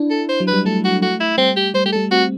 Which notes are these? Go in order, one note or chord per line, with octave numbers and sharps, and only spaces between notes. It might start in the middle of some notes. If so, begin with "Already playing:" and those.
Already playing: D4 E4
A4
C5
F#3
B4
G3
A3 A4
F#4
A3 F#4
E4
G3 C4
G4
G3 C5
A3 G4
G3 A4
C4 F#4